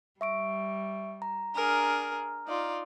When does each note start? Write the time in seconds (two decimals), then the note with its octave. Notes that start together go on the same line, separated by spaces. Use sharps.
0.21 G3 E5 C#6 D7
1.22 A#5
1.56 D4 G#4 A#4 A#5 F6
2.47 D#4 F4 D5